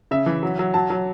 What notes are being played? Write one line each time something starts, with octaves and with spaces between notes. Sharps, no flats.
C#3 E5
E3
F#3
F#3
F#3 A5
F#3